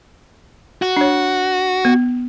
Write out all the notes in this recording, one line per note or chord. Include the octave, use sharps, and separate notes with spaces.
F#4
D4 C#5
B3